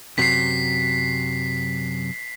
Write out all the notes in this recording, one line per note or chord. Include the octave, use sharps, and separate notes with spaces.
F#2 C3 F#3 B6 C7